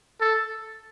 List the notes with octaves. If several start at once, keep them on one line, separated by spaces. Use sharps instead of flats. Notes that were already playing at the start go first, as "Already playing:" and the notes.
A4